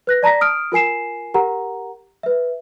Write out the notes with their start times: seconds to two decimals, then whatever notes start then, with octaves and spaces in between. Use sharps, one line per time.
0.07 B4 F#6 A#6
0.23 D5 A5 A#5 A#6 B6
0.41 D#6 F6 D7
0.72 F4 A#4 G#5 C7 E7
1.34 G4 A#4 F#5 A#5
2.23 B4 E5